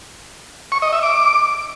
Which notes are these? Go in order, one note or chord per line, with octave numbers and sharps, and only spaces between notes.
C#6
D#5
E5
D6